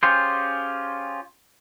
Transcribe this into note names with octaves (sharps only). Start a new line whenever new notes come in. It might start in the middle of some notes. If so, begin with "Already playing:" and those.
C#4 F4 G4 G#4 C5